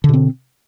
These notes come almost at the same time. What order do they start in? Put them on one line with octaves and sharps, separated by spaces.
D3 B2 C4